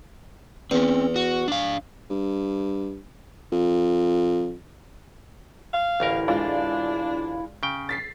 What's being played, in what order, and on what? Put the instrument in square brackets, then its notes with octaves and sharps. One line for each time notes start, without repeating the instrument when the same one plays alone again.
[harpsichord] E2 [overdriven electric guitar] C4 C#4
[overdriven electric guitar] F#4
D4 F5
[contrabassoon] G2
F2
[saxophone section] F5
[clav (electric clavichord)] A1 D2 A#4 [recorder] E4
[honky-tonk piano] G#3 F4 D5 [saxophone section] D4
[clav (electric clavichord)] C#3 G5
[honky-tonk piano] A6 B6 C7